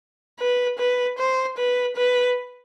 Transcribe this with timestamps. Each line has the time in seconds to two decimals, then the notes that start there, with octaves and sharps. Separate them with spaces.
0.40 B4
0.79 B4
1.18 C5
1.58 B4
1.96 B4